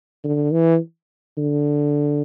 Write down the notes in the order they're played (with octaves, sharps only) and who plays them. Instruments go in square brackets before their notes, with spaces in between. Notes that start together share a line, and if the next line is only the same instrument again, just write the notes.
[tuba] D3
E3
D3